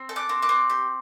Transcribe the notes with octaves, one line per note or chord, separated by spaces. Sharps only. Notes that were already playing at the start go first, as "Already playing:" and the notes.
Already playing: C4
A4
D6 F#6
C4
D6 F#6
C4
G4